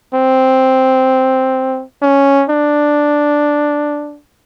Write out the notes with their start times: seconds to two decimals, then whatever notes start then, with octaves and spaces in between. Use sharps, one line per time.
0.14 C4
2.02 C#4
2.49 D4